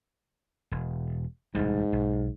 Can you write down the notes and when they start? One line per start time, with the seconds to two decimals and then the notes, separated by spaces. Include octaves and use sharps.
0.71 E1
1.55 E1 D2 G#2 G3
1.92 B1